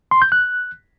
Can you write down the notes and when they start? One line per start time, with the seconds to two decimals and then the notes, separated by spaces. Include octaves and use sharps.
0.11 C6
0.22 G6
0.32 F#6